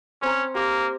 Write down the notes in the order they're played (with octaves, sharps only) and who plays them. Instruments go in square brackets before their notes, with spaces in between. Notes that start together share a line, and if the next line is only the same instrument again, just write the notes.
[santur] C4 A#5 [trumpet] C#4
[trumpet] A#3 [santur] G4